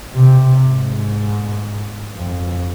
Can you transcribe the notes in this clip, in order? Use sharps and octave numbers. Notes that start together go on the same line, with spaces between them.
C3
G#2
F2